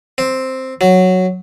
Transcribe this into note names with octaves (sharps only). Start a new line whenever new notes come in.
C4
F#3